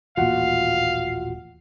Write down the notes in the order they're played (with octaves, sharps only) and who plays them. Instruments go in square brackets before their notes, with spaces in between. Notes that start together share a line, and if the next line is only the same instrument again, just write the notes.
[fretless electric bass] D#1 A1 A#2 [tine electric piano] F4 F#4 F#5 [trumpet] F5